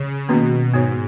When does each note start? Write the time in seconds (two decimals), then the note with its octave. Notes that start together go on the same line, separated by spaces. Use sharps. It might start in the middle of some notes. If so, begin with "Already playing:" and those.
Already playing: C#3
0.29 B2 D#3 A#3 C#4 F#4
0.74 G#2 B3 F#4 C#5